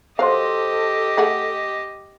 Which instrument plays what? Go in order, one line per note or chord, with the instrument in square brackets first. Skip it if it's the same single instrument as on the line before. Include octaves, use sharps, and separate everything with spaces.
[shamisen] F#3 F5 [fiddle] G4 D#5 [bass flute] A4 [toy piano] A#4 C5 C6
[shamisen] A3 G#4 F#5